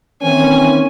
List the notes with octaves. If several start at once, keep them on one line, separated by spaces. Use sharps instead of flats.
D#3 E3 A#3 C4 C#4 G#5